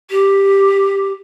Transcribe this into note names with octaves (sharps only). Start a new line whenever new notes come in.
G4